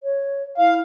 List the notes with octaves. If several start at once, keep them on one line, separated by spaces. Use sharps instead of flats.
C#5
E4 F5